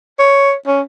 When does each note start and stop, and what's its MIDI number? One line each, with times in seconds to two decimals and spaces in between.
0.19 0.54 73
0.67 0.81 61